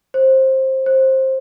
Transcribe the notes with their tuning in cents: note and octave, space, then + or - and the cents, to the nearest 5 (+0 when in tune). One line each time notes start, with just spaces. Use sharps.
C5 +20
C5 +20